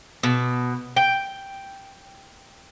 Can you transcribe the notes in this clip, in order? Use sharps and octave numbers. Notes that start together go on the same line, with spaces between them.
B2
G5